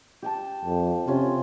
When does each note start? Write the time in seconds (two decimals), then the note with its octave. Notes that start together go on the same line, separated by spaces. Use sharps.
0.22 G4 G5 A5
0.65 F2
1.07 C3 C#4 F4